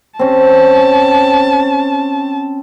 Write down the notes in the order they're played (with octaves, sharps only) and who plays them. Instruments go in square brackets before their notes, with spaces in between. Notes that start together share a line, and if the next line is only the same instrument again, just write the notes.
[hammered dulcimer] C4 C#4 [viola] A5